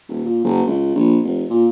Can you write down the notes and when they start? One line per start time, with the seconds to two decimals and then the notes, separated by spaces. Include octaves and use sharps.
0.09 D#1
0.25 A#2
0.44 F#1
0.67 C#2
0.95 A#1
1.23 F1
1.50 A#2